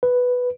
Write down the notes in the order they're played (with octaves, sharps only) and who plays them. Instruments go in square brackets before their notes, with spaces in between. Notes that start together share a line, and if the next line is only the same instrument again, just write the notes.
[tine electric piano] B4